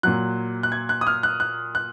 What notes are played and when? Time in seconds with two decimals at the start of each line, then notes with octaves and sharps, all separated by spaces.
0.03 A#2 F#3 F#6
0.63 F#6
0.72 G#6
0.89 F#6
1.01 D#6
1.07 F6
1.23 F#6
1.40 F#6
1.75 F#6